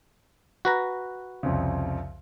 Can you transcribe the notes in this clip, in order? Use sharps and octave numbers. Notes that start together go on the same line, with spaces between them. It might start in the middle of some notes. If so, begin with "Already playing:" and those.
F#4 B4 A#5
C2 F2 C#3